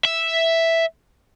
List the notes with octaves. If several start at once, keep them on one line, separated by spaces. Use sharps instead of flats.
E5